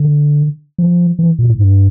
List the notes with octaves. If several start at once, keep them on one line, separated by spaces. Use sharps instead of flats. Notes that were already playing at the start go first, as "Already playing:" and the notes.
Already playing: D3
F3
E3
A#2
A2
G2